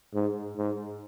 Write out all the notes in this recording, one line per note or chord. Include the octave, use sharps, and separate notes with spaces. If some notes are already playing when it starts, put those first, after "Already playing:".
G#2
G#2